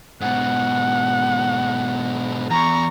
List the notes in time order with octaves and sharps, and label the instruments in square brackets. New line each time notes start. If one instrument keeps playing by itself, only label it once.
[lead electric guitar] G#2 B2 [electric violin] F#5
[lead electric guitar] E2 [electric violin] A#5 C#6